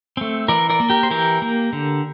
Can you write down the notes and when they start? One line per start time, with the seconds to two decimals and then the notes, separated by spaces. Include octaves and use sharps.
0.17 A3 C4
0.48 E3 A#4 D5
0.70 A#4 D5
0.80 A#3
0.90 G4 A#4
1.03 C5
1.11 E3 G4 A#4
1.42 A#3
1.73 D3